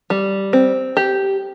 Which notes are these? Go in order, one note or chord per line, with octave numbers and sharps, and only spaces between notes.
G3
C4
G4